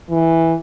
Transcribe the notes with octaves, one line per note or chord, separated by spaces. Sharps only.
E3